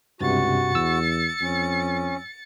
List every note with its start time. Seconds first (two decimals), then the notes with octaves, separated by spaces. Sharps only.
0.21 C#2 G2 C3 F#4 A6 C#7
0.75 E2 E6
1.41 F2 C#4